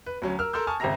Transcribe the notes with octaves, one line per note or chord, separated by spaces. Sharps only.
B4
D2 F#3 C#4
A#4 E6 F6
A4 A#4 C6 E6 G6
G#5 A5 C#6 D#6 F6
G#1 C#3 G4 E5 A#5 A#6